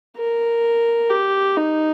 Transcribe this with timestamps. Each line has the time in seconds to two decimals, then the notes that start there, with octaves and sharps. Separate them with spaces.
0.17 A#4
1.10 G4
1.57 D#4